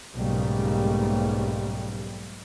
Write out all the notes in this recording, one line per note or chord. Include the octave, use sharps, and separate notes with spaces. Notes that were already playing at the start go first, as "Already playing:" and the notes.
B1 G#2 C#3 G3 A3 A#3